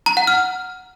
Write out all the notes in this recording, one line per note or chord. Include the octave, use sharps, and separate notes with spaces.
A#5
F#5
F6